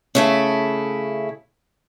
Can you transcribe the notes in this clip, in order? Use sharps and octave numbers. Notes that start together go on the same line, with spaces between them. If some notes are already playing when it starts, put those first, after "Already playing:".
C#3 A3 E4